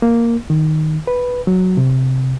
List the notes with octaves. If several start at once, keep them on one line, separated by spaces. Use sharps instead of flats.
A#3
D#3
B4
F#3
C3